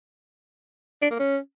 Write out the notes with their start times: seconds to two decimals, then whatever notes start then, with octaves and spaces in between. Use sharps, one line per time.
1.02 D4
1.11 A#3
1.20 C#4